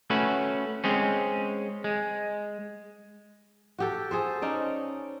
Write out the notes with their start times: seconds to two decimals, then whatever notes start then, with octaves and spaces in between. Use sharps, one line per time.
0.10 A3 C#4 F#4 B4
0.84 G#3 C4 C#4
1.84 G#3
3.78 F#4 G4 A4
4.11 G#4 A4 C5
4.42 C#4 D#4 D5